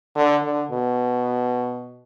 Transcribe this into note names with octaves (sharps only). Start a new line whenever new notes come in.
D3
D3
B2